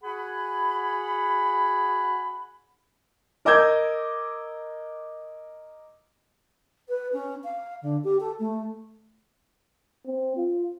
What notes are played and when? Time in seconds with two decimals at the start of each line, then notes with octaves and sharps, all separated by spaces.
0.04 F#4 G#4 F#5 G#5 B5
3.45 A#4 D#5 D6 E6 G6 G#6
6.88 B4
7.12 C#4
7.43 F5
7.82 D3
8.04 G4
8.20 A4
8.39 A3
10.06 C4
10.37 F4